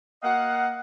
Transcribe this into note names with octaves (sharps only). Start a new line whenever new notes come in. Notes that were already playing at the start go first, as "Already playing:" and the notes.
A#3 D#5 F5 F#5